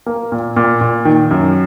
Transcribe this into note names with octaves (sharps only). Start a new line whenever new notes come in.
A#3
A#2
A#2
A#2
D#3
F#2